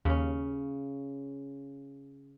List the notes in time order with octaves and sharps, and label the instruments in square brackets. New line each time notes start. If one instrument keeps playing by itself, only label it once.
[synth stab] D#2 [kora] C#3 C#4